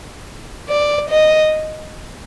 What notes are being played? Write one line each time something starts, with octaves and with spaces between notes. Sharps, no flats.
D5
D#5